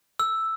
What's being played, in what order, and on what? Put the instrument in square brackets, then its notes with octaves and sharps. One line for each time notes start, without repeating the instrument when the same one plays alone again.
[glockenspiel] E6